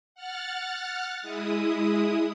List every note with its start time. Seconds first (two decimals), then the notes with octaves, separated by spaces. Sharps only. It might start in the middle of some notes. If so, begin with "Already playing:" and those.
0.15 F#5 F6 F#6 A6
1.22 G#3 E4 D#6